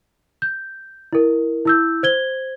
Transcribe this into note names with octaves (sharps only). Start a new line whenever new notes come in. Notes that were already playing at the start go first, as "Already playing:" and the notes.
G6
E4 A#4
E4 E6 G6
C5 G#6 G7